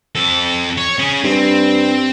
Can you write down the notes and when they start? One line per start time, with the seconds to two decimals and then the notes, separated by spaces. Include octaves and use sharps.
0.15 F2 A4
0.77 C#5
0.99 C#4 G#4
1.24 G2 C4